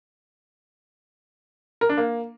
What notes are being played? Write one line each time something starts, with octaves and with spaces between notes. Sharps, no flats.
A#4
D4
A#3